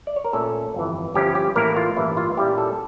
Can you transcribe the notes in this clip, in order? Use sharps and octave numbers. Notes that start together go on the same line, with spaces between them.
D5
C#5
A#4
A#2 A3 C#4 A4
G1 F2 E3
G1 G2 F3 C#4 E4 G4
G4
A2 E3 A#3 E4 A#4
F4
A1 G2 E3 A#3 E4
F4
A#2 G3 C#4 E4 G4
A4